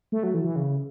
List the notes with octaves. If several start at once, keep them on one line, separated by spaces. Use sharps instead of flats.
A3
F#3
E3
E3
C#3